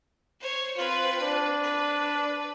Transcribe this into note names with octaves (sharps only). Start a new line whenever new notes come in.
C5 C#5
C4 F4 B4
D4
B4